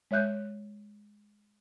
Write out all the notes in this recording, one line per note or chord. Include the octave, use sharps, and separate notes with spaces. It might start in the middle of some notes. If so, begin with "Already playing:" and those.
G#3 C#5 E5 F#6 G6